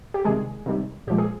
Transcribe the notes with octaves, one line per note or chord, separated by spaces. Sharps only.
G4
C3 D#3 G3 G#3 G#4
C3 D#3 G3
A#2 F3 G#3 G4
G#4